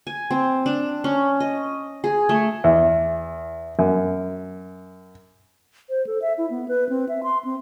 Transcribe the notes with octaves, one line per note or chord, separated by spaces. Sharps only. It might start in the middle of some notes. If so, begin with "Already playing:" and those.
G#5
C4
D4
C#4
D#5
G#4
A3
E2
F#2
C5
A4
E5
E4
B3
B4
C4
E5
C6
C4